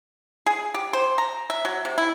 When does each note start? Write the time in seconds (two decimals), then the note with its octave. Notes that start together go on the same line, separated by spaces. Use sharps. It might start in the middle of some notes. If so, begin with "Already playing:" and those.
0.46 G#4
0.74 G4
0.93 C5
1.18 A#5
1.50 E5
1.65 F#3
1.85 C3
1.98 E4